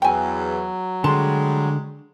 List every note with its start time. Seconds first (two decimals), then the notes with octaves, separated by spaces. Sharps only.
0.02 E2 F#3 G5 G#5
1.04 D3 G3 G#3 A5 C6